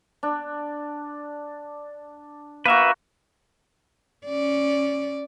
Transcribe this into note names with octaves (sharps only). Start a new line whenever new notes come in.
D4
A#3 F#4 B4 E5
C#4 D5